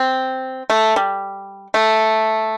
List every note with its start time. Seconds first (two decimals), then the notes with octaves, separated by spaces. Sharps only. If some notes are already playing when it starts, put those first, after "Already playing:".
Already playing: C4
0.70 A3
0.96 G3
1.74 A3